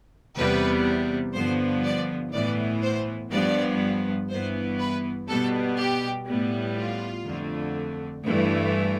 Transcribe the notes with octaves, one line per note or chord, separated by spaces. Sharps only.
E2 C3 G3 B3 B4
G2 D3 F3 B3 C5
D5
A2 E3 B3 D5
C5
G2 F3 B3 D5
G2 E3 B3 C5
B4
B2 G3 B3 A4
G4
A2 G3 B3
F4
F2 D3 A3
G2 E3 A3